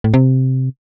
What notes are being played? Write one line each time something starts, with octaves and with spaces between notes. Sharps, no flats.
A2
C3